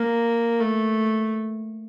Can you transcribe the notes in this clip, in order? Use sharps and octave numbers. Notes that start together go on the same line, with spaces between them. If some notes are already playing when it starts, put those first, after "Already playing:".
Already playing: A#3
A3